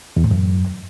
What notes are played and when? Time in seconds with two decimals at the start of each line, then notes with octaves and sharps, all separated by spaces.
0.17 E2
0.24 A2
0.31 F#2